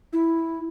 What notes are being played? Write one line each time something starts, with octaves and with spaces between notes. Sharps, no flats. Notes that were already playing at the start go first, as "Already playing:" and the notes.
E4